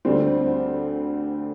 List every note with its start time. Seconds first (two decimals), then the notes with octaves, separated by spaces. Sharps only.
0.05 D2 D3 G3 C4